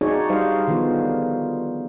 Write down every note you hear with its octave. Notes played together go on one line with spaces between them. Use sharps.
D4 D#4 F#4 G#4 C#5 D5
G3 D#4 C5 D#5 F5
D3 D#3 F3 B3 F4